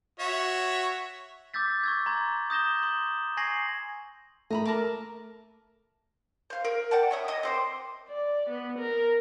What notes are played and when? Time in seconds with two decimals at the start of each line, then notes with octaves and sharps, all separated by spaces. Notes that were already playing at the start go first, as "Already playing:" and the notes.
0.20 F#4 C#5 E5
1.54 D6 E6 G6 A6 B6
1.84 C#6 E6 G#6
2.06 A#5 C6 G#6
2.50 D#6 G6 A#6 E7 G7
2.83 C6
3.37 G#5 C#6 G#6 A#6 C7 F#7
4.50 A3 D#5 A#5 B5
4.65 A#4 A5 D6
6.50 C5 F5
6.65 A#4
6.91 D5 F#5 G5 A5
7.11 C#4 E4 D#6
7.28 D#5 A5 D#6
7.43 C4 C5 D5
8.09 D5
8.50 B3
8.79 A#4